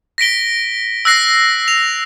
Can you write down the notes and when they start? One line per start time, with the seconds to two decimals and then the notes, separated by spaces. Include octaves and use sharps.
0.18 A#6 B6 D7 G7
1.05 E6 F#6 A#6 C7
1.68 F7